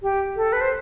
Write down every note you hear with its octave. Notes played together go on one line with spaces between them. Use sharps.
G4
A4
B4
C5